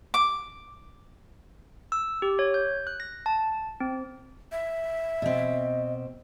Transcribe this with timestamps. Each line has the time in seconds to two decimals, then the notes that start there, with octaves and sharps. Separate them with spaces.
0.14 D6
1.92 E6
2.22 G4
2.39 C#5
2.54 G6
2.87 F#6
3.00 A#6
3.26 A5
3.80 C4
4.52 E5
5.22 B2 C4 D#5